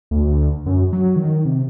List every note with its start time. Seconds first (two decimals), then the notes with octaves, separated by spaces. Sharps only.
0.11 D2
0.66 F#2
0.93 F#3
1.16 D#3
1.45 C3